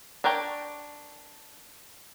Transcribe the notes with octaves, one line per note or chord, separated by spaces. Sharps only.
D4 A#4 C#5 G5